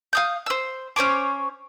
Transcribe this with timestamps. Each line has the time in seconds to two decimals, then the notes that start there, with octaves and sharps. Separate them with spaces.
0.13 F5 D#6 G6
0.46 C5 E6
0.96 C#4 C5 C#5 D6